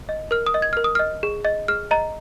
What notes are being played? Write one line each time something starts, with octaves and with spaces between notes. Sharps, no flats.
D#5
A#4 F6
D#6
D#5
G#6
A#4 F6
D#6
D#5 F6
G#4
D#5
G#4 F6
D#5 A#5